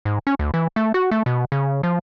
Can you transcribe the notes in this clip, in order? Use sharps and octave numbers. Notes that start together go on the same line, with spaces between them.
G#2
C#4
D2
E3
A3
F#4
A3
B2
C#3
F3